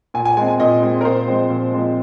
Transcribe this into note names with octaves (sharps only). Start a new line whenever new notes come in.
A#2 G#5
G#5
G#3 C4 G#5
G#5
A#2 D#5
G#3 C4
A#4
A#2 C5
F3 G#3 C4
A#2
F3 G#3 C4